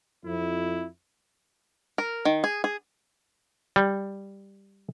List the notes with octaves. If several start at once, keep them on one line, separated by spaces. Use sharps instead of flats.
F2 E4
A#4
D#3
G#4
G#4
G3